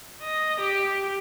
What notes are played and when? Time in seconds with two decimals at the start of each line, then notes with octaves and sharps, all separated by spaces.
0.22 D#5
0.60 G4